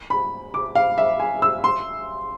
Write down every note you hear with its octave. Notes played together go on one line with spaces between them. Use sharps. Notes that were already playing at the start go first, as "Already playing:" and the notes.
B5
D6
F5
E5
G#5
E6
C6